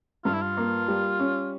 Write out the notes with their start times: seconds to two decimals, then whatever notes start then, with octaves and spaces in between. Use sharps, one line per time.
0.25 G2 F4
0.34 E4
0.42 F4
0.57 A#3
0.88 G3
1.20 C#4